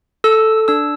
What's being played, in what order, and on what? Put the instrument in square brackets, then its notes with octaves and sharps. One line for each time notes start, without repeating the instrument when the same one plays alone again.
[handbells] A4 E6
D4 E6